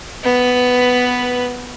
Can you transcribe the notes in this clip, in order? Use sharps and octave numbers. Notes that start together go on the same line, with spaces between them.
B3 B4